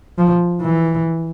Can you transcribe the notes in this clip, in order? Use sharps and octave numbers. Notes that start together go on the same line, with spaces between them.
F3
E3